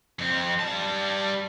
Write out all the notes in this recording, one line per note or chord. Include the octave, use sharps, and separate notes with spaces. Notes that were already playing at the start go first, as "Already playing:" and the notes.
F2 C4
G3 A5